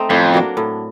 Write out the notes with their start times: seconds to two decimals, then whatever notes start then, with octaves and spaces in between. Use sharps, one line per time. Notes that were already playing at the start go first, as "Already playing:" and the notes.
Already playing: A3 C4 D#4
0.10 F2 A2
0.34 F#3 A#3 D4
0.57 A2